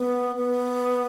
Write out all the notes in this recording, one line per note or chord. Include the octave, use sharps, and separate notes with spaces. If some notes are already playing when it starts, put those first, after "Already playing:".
Already playing: B3
B3